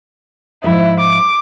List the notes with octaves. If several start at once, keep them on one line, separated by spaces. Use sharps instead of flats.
G#2 F3 E4 E5
D6